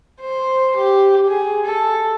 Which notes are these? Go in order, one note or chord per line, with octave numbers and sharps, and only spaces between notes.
C5
G4
G#4
A4